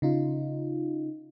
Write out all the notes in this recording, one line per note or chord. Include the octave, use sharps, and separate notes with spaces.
C#3 D#4 F4